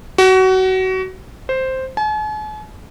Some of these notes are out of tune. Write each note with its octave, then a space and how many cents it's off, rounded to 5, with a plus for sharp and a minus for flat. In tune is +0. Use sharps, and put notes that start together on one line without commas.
F#4 +25
C5 +0
G#5 +45